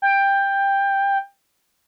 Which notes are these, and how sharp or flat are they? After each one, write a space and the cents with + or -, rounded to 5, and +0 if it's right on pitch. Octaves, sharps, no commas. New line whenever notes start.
G5 +15